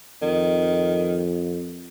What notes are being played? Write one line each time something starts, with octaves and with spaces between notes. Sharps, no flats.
F2 D#3